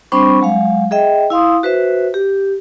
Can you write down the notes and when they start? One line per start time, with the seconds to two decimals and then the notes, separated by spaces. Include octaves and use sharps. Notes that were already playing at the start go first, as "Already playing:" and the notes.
0.12 G3 C4 D4 C5 B5 C#6
0.42 F#3 G#3 F5
0.91 G#4 D#5 E5 G5
1.30 E4 F5 C6 D#6
1.63 F#4 B4 C5 E5
2.14 G4